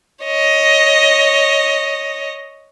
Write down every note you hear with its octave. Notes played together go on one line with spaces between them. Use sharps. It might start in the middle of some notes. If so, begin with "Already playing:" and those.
C#5 D#5